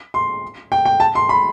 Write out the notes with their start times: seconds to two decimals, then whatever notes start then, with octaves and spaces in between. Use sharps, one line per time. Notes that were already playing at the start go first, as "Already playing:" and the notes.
0.14 C6
0.72 G5
0.86 G5
1.00 A5
1.15 C6
1.29 B5